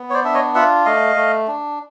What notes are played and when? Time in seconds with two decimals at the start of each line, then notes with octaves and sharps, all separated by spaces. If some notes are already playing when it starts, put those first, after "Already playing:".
Already playing: B3
0.10 C#5
0.14 C5 D5
0.24 D4 E5
0.34 C#5 D#5
0.55 F4 E5 F#5
0.85 A3 D#5 F5
1.16 A3
1.47 D4